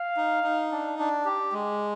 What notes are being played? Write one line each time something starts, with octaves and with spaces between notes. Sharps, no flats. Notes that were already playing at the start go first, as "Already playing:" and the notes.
Already playing: F5
D#4
D#4
D4
D4
G4
G#3